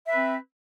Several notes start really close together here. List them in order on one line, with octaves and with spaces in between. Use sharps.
E5 B4 C4